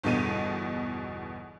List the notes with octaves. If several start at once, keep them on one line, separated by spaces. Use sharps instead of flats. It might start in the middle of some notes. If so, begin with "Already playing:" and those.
G1 E2 B2 D#7